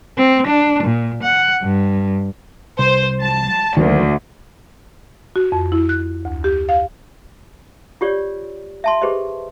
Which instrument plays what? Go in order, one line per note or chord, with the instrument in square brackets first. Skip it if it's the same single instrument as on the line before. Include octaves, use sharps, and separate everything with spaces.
[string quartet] C4
D4
A#2
F#5
G2
[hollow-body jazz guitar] C2 [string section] C5
[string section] A5
[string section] D2 [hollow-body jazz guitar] D#3 F#3 A#3
[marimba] F#4
F2
E4
F#6
D2
G4
F5
[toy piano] F4 G4 C#5 D5
E5 A5 C6
G4 G#4 B4 C5 D#5